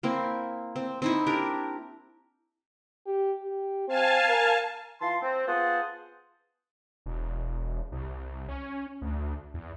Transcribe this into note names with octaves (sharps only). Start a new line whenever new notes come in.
A#3 C4 E4
C4
C4 D#4 E4
D4 G4 A#4
G4
G4
C4 F5 G#5 A5
A#4
E3 F4 A5 C6
C4
B3 F4 G#4 C5 F#5 A5
E1
C2
C#4
D2
E2